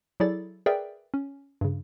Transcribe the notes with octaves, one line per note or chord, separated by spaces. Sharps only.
F#3 E4 G#4 A4 D5 A6
G#4 A#4 B4 D5 E5 G5
C#4
G2 C#3